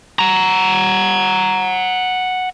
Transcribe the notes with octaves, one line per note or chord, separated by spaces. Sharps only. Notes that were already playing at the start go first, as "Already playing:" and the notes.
F#5 A#5